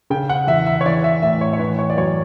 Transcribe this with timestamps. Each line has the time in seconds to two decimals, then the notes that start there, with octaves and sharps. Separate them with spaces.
0.10 C#3 G5
0.29 F#5
0.47 E2 E5
0.66 E5
0.81 C#5
0.86 E3 D5
1.04 E5
1.22 A2 E5
1.41 C#5
1.53 C#5
1.59 E3 B4
1.79 C#5
1.90 D5
1.97 F#2 C#5